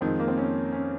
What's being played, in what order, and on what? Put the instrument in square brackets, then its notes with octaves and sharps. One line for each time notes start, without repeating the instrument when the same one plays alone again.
[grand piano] F2 D#3 G#3 [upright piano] C4
[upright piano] A#3
C4
C#4
C#4